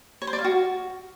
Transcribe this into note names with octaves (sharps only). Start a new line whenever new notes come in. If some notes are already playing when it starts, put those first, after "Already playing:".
C#5
C5
D5
F5
F#4